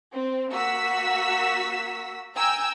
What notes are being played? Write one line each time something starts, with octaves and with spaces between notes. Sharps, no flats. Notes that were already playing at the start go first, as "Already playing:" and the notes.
C4
A#3 F#4 E6 B6
G5 G#5 A#5 E6